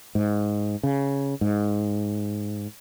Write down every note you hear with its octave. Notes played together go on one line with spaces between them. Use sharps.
G#2
C#3
G#2